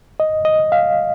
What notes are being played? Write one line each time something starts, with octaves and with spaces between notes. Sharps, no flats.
D#5
D#5
F5